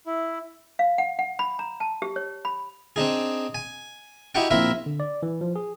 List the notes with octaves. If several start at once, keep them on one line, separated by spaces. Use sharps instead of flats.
E4
F5
F#5
F#5
B5
A#5
A5
G4
C#5
B5
C4 D4 D#4 G#4
G#5
D#4 E4 F#4 G4 F#5 G5
A#1 C4 E4 A#4 E5
D3
D5
E3
F3
G#4